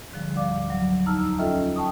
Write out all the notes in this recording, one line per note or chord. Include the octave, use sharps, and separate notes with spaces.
G#2 D3 F3 G3
D2 D5 F5 D6
F#3
E2 D#4 A5 A#5 E6 F6
C#4 F4 A4 D#5 E5 G5
G5 A5 C#6 D#6